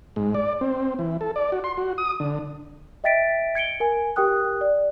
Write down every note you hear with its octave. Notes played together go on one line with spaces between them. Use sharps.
G#2
D5
C4
E3
A4
D5
F#4
C6
F#4
D#6
D3
D#5 E5 G5 A6 B6 D7
G#6 C#7 D7 G7
A#4 G#5
G4 A#4 G5 D#6 F#6
D5